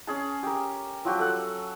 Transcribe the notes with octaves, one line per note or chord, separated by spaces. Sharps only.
C#4 G#4 A5
G4 A#4
F3 F#3 F#4 G4
A4 F#5